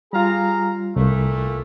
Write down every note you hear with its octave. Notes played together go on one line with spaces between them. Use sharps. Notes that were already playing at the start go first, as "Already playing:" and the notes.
G3 F4 G#4 F5 A#5
C2 A#2 A3